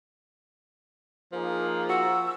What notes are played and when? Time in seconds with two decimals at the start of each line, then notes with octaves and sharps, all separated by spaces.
1.32 F3 A#3 D#4 G#4
1.89 F#4 E6